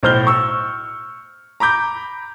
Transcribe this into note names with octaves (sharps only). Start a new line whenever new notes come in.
B1 A2 C5 F6 G6 G7
C#6 E6
A#5 B5 D6 G6